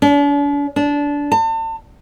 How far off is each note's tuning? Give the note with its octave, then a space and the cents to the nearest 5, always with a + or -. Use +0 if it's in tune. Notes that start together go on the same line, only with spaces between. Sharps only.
D4 -45
D4 -20
A5 +40